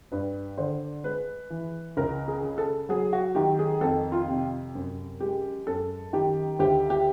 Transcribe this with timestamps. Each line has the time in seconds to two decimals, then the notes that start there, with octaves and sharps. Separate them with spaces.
0.12 G2 B4
0.58 D3 C5
1.04 G#3 B4
1.50 E3
1.97 C#2 A#4
2.28 G#4
2.43 C#3
2.58 A4
2.89 F#3 G#4
3.13 F#4
3.35 D#3 G4
3.59 G#4
3.81 F2 A4
4.12 F4
4.28 C3
4.75 F#2
5.20 G#3 G4
5.67 F#2 A4
6.13 D#3 G4
6.59 D2 G4
6.90 G4